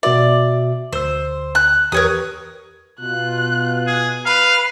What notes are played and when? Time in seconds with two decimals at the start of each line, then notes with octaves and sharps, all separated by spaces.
0.03 B2 F#4 D5 E5
0.93 D2 C5 E6
1.55 F#6
1.92 E2 G4 A#4 B4 C#5 D#6
3.00 B2 F4 F#6
3.87 G#4
4.26 B4 F5